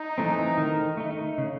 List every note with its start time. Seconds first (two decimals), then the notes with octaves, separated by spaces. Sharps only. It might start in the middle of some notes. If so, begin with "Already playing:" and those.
Already playing: D#4
0.18 E3 A3 C4
0.58 D#3
0.97 A3 D#4
1.38 C#3